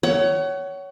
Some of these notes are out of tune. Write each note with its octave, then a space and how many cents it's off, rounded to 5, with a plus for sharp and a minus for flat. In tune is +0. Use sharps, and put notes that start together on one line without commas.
C#5 +15 F#5 +35